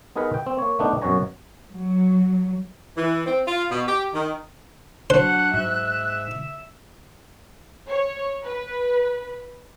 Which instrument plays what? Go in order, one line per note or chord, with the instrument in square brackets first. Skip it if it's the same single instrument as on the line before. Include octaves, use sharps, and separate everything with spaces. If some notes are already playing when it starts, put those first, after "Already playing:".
[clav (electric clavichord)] B3 D#4 G#4 A#4 B4 F#5
G5
C4
A#3 C#5
A3 B3 D4 D#4
F#2 B2 F#4 C#5 G#5 A#5
[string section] F#3
[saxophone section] E3
C4
F4
B2
G4
D#3
[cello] F#3 F#5 [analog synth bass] D4 [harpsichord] C5 [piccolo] F#6
[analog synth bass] G#2 [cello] E5
[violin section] C#5
B4